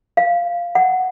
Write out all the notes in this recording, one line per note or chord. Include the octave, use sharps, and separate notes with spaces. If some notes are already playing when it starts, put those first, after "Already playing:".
F5
F#5